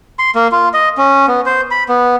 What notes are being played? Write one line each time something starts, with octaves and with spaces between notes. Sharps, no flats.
C6
A#3
F4
D#5
C#4
B3
C5
B5
B3